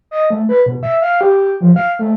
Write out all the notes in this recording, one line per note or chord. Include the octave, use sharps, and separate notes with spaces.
D#5
A3
B4
B2
E5
F5
G4
F3
F5
A3